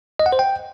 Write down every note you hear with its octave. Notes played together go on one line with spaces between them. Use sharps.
D#5
F#5
C5
G5